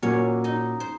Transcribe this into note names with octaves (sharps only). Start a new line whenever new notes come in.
A#2 F#3 A#3 C#4 C#5
D#4 D#5
C5